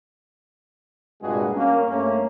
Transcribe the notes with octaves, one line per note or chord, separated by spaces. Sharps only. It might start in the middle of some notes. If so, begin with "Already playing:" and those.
C2 G2 A#2 G#3 F#4 G#4
A#3 C#4
G2 A3 A#3 C#4